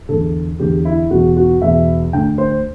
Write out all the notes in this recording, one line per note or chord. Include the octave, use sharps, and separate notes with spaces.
E2 D3 A4
E2 D3 G4
E4
E2 B2 F#4
F#4
E2 B2 E5
D2 D3 G5
C5